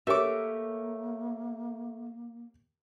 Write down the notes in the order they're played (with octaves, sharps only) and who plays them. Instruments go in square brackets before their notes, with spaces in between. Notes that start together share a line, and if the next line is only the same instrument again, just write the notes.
[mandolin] A3 D6 [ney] A#3 [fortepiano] G4 A#4 C#5 [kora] E5